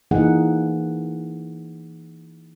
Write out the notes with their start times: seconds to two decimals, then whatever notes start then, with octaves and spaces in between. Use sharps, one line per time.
0.11 E3 A#3 D#4 G#4 F#5